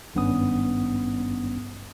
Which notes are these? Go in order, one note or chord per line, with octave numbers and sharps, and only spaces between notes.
G#1 G2 B3 C#4 D#6